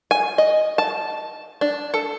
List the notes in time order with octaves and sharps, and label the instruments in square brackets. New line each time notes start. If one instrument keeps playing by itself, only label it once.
[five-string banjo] G#5
D#5
A5
D4
A4